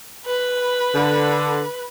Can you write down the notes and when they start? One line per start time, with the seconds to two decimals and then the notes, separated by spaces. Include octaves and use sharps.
0.26 B4
0.94 D3